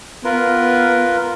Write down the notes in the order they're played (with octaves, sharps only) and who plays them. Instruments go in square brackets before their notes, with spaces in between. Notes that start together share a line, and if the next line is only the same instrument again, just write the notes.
[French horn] B3 [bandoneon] F4 A#4 B4